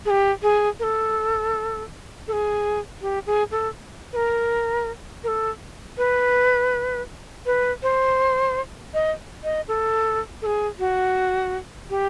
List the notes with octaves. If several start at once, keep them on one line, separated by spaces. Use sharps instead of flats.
G#4
G4
G#4
A#4
A4
A4
G#4
G4
G#4
A4
B4
A#4
A#4
A4
B4
B4
C5
D#5
D#5
A4
A4
G#4
F#4
G4